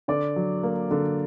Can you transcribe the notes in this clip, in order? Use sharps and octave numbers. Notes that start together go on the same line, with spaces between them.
D3 D5 D6
F#3
A#3
D3